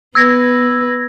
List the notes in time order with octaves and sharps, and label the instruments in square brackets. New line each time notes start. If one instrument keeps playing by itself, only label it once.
[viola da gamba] B3 B4 [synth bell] E6 G#6 A#6